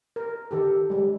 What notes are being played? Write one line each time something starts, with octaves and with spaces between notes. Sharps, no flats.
A#4
D#3 G4 A4
G3 G#3